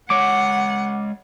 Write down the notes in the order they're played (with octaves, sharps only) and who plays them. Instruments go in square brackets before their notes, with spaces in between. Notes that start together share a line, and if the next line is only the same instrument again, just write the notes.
[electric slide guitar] G#3 C#5 [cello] F#5 [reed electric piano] D6